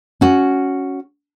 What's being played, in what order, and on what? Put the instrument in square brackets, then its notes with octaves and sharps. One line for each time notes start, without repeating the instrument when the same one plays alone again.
[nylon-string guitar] C#4 F#4